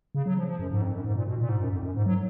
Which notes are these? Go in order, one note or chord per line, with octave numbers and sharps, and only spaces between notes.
C#3
F#3
F3
F3
F#2
G#2
F2
F#2
G#2
A#2
B2
A#2
G#2
F#2
F2
F#2
G#2
F#3